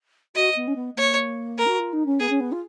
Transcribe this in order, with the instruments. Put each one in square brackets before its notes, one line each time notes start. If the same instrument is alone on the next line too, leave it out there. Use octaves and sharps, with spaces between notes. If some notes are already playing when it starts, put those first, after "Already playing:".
[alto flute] F#4 [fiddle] D#5
[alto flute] B3
C#4
B3
[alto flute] A#3 [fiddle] C#5
[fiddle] A#4
[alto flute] F#4
F4
D#4
C#4
[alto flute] B3 [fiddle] G#4
[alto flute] C#4
B3
F4